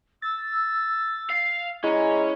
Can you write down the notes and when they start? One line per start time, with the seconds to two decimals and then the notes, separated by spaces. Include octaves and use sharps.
0.22 E6 A6
1.30 F5
1.84 G#3 C#4 E4 A#5